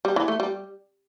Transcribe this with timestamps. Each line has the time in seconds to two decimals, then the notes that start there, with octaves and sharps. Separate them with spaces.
0.05 G3
0.16 E3
0.28 A3
0.40 G3